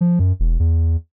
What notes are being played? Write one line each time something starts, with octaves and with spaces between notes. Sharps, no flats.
F3
F#2
E1
E2